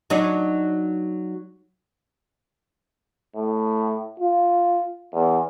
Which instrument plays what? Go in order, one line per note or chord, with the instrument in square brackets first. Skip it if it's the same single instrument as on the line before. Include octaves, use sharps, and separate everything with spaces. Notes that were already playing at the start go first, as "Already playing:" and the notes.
[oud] F#3 D4 D#4
[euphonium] A2
F4
E2